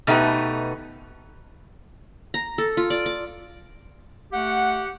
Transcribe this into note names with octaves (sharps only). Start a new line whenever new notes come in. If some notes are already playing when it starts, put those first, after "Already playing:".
B2 A3 D#4 G4 B4
A#5
A4
F4
D5
D6
A3 G4 F#5